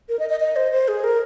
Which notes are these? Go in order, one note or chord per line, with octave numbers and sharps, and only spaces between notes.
A#4
D#5
D#5
D#5
C5
C5
G#4
A#4